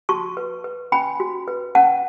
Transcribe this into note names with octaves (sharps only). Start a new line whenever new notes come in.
F#4 A5 C#6
B4
B4
C#4 G#5 B5
F#4
B4
C#4 F#5 A5